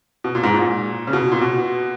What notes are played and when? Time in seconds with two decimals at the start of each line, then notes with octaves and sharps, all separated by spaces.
0.24 B2
0.35 A#2
0.43 G#2
0.54 A#2
1.07 C#3
1.13 B2
1.32 A#2
1.41 B2